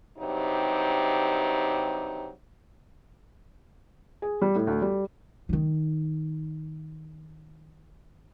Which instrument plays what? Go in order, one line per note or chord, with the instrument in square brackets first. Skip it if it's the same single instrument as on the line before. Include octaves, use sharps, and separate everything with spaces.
[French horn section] G2 C3 F#3 D#4
[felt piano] G#4
G3
A2
D2
G3
[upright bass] D#3 D#4